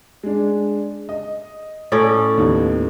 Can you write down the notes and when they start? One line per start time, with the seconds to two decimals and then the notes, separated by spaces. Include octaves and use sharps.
0.23 G#3 D4
1.09 D#5
1.92 A2 C#4 D5
2.38 D#2 B3 D#4